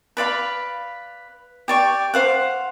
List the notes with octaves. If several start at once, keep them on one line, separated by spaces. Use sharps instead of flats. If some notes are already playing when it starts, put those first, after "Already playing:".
B4 D5 F5 B5
G4 D5 C#6
C5 F5 F#5